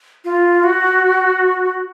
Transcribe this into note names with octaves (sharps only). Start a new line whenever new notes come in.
F4
F#4